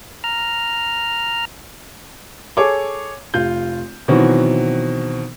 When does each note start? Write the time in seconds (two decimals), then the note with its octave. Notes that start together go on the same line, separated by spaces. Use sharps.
0.24 A#5 F6
2.57 G#4 A4 C#5 D6
3.34 F1 F4 G6
4.08 B2 D#3 E3 F#3 C4